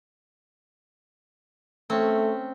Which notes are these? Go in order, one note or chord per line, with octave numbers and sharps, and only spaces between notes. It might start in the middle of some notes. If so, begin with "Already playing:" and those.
A3 C4 C#4